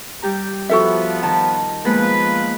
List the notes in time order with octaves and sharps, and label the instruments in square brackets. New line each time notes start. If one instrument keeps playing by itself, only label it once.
[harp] G3 G4 A#5
[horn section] F3 B3 [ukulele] F#4 A4 E5
[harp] D#3 [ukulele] A5
[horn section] F3 B4 [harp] G#3 A#3 B3